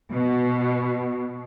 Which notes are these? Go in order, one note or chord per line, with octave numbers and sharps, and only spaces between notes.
B2